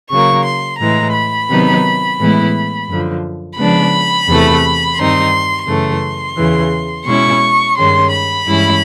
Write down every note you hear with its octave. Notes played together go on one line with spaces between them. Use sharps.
C#3 F#3 A#3 C#6
C6
A2 E3 G#3 A#5
B5
C3 D#3 F#3 B3 D#4
A2 E3 G#3 B3 E4
F#2 D3 F3
C#3 F3 G#3 B3 D4 B5
E2 C3 E3 A3
G2 D#3 G3 C4 D#4 C6
F#2 C#3 E3 A3 C6
E2 C#3 E3
B2 G#3 C#4 E4 C#6
G2 D#3 G#3 C#4 C6
B5
G2 E3 G#3 C#4 E4